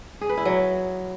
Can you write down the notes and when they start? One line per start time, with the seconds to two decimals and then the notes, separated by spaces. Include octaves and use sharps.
0.21 G#4
0.29 B4
0.37 E4
0.45 F#3